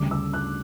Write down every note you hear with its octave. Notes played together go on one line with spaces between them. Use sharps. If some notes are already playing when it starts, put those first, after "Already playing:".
Already playing: D2 C#3 G3 D6
E6
F#6